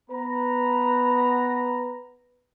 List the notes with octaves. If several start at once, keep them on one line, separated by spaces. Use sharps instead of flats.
B3 B4 A#5